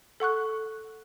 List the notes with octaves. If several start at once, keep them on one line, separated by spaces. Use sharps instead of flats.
A4 F#5 C#6 F#6